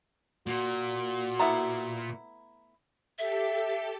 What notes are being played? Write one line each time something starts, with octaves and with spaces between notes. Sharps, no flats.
A#2 F#4
A3 B3 E4 A#5
G4 A4 E5